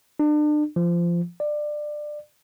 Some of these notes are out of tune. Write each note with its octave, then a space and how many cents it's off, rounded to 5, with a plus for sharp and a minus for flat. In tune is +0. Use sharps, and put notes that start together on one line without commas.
D4 +35
F3 -20
D5 +20